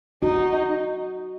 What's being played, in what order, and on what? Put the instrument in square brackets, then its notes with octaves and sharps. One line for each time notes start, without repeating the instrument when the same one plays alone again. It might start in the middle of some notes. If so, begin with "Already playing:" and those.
[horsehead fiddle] D#4 [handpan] F#4